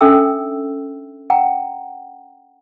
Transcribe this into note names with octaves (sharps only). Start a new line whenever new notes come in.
C#4 D4 A4 E5 G5 E6
F#5 G5 A#5